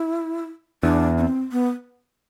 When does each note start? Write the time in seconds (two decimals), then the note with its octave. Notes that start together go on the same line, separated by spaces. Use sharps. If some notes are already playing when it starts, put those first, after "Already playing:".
Already playing: E4
0.83 E2 D4
1.17 D4
1.21 C4
1.52 B3